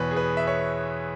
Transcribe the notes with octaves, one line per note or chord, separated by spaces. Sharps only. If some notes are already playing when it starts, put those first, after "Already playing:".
Already playing: E2 B2 B4 C#5
G#4
B4
E5
C#5